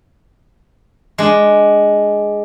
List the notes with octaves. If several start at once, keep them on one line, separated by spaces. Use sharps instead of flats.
G#3 D4